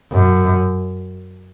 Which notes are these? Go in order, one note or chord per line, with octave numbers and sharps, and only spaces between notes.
F#2